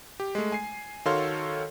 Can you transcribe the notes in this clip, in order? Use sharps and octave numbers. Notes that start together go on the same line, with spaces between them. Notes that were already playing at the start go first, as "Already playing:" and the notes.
G4
G#3 A3
G#5 C7
D#3 F#4 A4 C#5 F5 C6